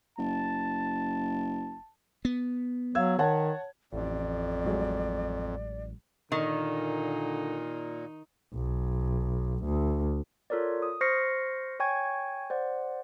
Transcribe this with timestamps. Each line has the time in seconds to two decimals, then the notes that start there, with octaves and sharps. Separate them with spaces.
0.18 F#1 A5
2.25 B3
2.95 F#3 F5 E6 G#6
3.19 D#3 C#5 F#5 A5
3.93 A1 F2 D5
4.65 A2 F#3 G#3
6.32 A#2 D3 D#3 D#4
8.54 B1
9.64 D2
10.50 F4 A4 A#4 C#5 D5
10.82 D#6
11.01 C5 C#6 F6 A#6 C7 C#7
11.80 C#5 G5 G#5 C#6 G#6
12.50 C5 D5 F#5